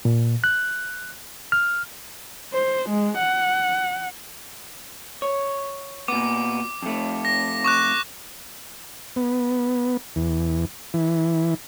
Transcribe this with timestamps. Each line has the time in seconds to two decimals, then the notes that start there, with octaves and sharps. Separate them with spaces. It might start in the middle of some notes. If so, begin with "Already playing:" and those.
0.05 A#2
0.44 F#6
1.52 F6
2.53 C5
2.89 G#3
3.18 F#5
5.22 C#5
6.08 A#2 B3 D6
6.82 F2 A3
7.25 A#6
7.64 C#6 D6 F#6
9.16 B3
10.16 E2
10.94 E3